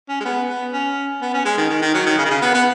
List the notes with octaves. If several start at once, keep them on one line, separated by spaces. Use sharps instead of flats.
C#4
G#3
B3
B3
C#4
B3
C#4
G#3
D#3
D#3
D#3
F#3
D#3
C#3
D#3
C#3
B3
B3